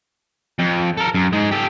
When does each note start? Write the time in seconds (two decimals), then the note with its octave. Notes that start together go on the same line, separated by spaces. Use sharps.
0.59 F2
0.97 A4 A#4
1.14 F#2
1.33 G#2 G#3
1.52 G4 A4